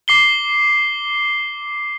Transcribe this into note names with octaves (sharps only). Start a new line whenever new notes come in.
D6 C7 G7